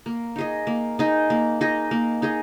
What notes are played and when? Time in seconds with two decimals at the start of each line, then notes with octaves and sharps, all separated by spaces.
0.06 A#3
0.36 D#4 G#4 D#5
0.67 A#3
0.99 D#4 G#4 D#5
1.30 A#3
1.61 D#4 G#4 D#5
1.91 A#3
2.22 D#4 G#4 D#5